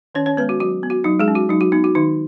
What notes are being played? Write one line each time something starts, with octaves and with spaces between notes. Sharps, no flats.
D#3 C#4 C#5
C#4 C#5
G#3 B3 B4
F#4
F#3 F#4
B3
F#4
F#3 D#4
G#3 G#4
C#4
F#4
F#3 D#4
F#4
B3 D#4
F#4
D#3 D#4